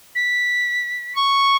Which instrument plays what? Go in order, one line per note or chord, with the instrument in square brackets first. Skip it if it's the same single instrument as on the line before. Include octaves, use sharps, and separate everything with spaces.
[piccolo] B6
[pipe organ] C#6